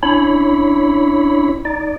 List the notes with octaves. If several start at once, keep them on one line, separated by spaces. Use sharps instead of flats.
C#4 D4 E4 C#5 B5
D#4 D5